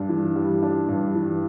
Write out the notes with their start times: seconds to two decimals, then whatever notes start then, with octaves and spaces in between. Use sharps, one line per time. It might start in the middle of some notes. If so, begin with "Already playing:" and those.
Already playing: G2 D4
0.09 E3
0.36 G3
0.63 D4
0.89 G2
1.16 E3